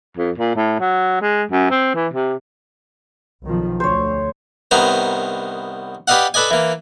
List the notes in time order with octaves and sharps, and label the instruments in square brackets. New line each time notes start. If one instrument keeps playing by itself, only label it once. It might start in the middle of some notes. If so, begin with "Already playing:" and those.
[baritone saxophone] F2
A#2
A2
F#3
G#3
F#2
C4
E3
C3
[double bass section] B1 D#3 F3
[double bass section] D2 [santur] C5 C#5
[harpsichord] C2 D#3 B3 C5 A#5
G4 B4 D5 D#5 F5 F#5
A4 B4 D5 D#5 G#5
E3 A#3